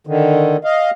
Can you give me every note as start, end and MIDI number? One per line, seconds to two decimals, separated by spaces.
0.07 0.57 50
0.07 0.57 51
0.64 0.91 75
0.64 0.91 77